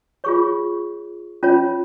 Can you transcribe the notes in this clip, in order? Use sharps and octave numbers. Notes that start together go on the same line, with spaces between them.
F4 G#4 C#5 C#6
C#4 F4 C#5